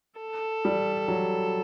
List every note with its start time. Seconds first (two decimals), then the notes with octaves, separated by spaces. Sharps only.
0.20 A4
0.65 G3
1.08 F#3